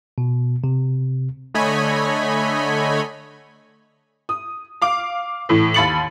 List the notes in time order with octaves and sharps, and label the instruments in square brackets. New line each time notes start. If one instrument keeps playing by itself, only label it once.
[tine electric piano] B2
C3
[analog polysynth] D3 A3 C#5 D#5 G#5 B5
[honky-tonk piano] D#6
F5 D6
A2 E3
D#2 B5 A6 C#7 F#7